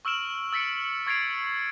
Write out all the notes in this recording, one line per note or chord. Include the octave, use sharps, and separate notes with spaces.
C#6 E6 F6 D7 E7 F#7
E6 A6 B6 C#7 D7
C#6 G#6 A6 C7 D7 F7